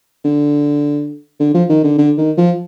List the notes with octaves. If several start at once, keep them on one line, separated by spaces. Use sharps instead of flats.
D3
D3
F3
D#3
D3
D3
D#3
F3